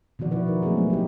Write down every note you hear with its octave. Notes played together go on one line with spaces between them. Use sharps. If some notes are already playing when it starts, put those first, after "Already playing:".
B2 D#3 F3 F#4 D5
F3 E4 F#4 B4
D#4 A#4
F#3 A3 A#3 C4 E4 G#4
B3
D#4 G4